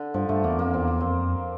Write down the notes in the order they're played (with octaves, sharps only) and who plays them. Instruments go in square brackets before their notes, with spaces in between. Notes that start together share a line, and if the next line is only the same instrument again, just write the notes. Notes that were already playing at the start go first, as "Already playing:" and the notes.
Already playing: [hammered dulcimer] D3
[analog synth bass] G2 [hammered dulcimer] F3
[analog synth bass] G2 [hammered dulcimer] A3
[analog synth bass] E2 [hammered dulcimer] A#3
[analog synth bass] F2 [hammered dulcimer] A#3
[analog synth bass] E2 [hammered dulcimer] C4
[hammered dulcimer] A#3
[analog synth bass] F2 [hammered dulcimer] C4